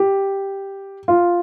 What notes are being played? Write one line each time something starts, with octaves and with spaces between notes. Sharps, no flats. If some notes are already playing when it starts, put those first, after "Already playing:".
Already playing: G4
F4